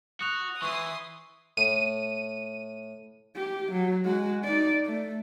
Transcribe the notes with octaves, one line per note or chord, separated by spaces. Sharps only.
F#4 D#6 F#6 F7
E3 E4 C6 C#6 D#6
A2 D#7
G4
F#3
G#3 F#4
D#4 D5
A3